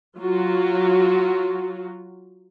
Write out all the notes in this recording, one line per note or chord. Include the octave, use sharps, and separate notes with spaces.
F#3 F4 F#4